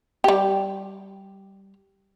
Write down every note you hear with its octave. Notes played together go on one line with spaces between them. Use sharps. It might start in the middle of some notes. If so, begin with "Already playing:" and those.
G3 G4